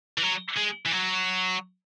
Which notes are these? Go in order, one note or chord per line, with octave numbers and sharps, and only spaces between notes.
E3
F#3
G#3
E3
F#3